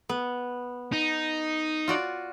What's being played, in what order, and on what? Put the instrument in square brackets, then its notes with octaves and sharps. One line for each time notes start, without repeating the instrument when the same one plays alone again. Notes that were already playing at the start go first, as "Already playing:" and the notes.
[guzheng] B3
[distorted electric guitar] D#4
[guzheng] F4 F#4 D5